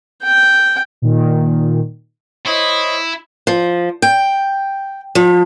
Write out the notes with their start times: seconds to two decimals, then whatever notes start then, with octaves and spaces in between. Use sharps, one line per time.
0.23 G5
1.02 A#2 D#3
2.46 E4 C5 C#5 D#5
3.47 F3
4.02 G5
5.15 F3